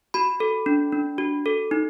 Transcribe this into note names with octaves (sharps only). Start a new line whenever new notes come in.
F#4 B5
A4
D4
D4
F#4
A4
D#4